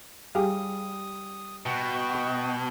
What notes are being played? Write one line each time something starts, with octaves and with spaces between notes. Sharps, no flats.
G3 G4 G#4 F5 D#6
B2 F#4 G5